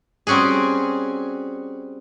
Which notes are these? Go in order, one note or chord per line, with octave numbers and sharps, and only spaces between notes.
G3 C4 C#4 F#4 G#4